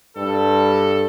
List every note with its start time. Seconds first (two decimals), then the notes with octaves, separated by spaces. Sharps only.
0.17 G2 A4